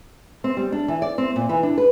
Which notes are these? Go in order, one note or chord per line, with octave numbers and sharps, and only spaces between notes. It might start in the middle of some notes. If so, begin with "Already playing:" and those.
C4
G3
D4
E3
D5
C4
A#2
E3
D4
B4